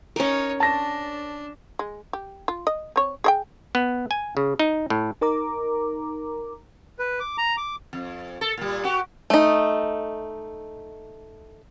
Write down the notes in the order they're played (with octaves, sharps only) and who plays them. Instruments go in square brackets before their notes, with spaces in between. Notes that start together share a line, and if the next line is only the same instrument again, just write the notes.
[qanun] C#4 A#4 [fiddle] D#4 C#5
[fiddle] D4 [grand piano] A5 A#6
[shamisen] G#3
G4
F4
D#5
C4 C#5
G#4 D#5 G5
[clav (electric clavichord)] B3
G#5
C#3
D#4
A2
[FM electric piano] D#4 A#4 A#5 D6
[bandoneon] B4
D6
A#5
D6
[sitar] F2
A4
A#2 G3
F#4 G4
[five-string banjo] A3 D#4